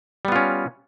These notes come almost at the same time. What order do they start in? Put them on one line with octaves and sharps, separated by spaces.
G3 B3 F4 C#4